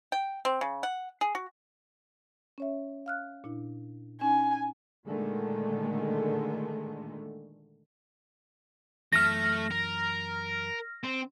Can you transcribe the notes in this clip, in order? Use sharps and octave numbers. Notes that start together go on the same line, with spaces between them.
G5
C4
C#3
F#5
G#4
F#4
C#4 C#5 E5
F5 F6 F#6
A#2 D4 E4
C#4 D#4 G#5
A#2 D3 D#3 G#3 A3
F#2 E3 A3 F6 A#6
A#4
C4